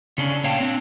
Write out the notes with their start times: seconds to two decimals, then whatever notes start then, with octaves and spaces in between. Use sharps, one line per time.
0.18 C#3 C#4 D4
0.44 A#2 C#5 F5 G5 A5
0.60 C4 D4